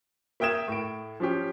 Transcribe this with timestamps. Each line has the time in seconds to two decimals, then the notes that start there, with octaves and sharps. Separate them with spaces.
0.40 A#3 E5 G5 D#6 G#6 E7
0.68 A2 D7
1.20 F3 C#4 G4